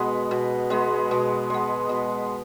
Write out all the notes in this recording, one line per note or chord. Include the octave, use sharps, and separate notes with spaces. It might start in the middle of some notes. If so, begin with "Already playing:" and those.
Already playing: B2 G#3 B3
B2
G#3 B3
B2
G#3 B3
B2